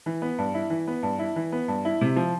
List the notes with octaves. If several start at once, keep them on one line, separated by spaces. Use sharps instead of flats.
E3
B3
G2
E4
E3
B3
G2
E4
E3
B3
G2
E4
C3
F3